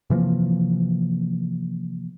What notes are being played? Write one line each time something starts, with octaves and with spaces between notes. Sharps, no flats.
C3 E3 F3 A#3